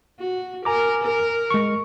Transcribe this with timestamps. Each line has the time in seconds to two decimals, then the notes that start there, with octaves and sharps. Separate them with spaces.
0.20 F#4
0.65 A#4 G#5 A#5 D6
1.03 A#4
1.50 G#3 C#6